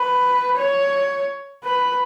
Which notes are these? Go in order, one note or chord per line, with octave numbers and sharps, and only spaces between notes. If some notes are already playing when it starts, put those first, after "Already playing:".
Already playing: B4
C#5
B4